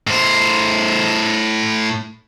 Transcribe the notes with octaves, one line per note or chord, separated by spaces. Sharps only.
A2 C5